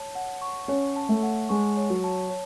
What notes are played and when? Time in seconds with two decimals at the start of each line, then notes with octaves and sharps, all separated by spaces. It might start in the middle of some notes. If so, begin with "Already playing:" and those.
Already playing: C#5 A5
0.15 F#5
0.42 C#6
0.68 C#4 C#5
0.96 A5
1.09 A3
1.23 F#5
1.49 G#3 C#6
1.77 C#5
1.90 F#3
2.04 A5
2.30 C#5